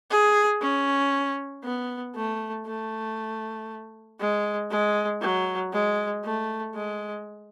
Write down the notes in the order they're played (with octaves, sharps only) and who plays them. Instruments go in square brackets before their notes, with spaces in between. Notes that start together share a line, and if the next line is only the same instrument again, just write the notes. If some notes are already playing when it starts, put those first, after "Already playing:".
[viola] G#4
C#4
B3
A3
A3
G#3
G#3
F#3
G#3
A3
G#3